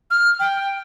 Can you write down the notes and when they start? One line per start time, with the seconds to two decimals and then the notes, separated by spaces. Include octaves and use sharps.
0.11 F6
0.40 G5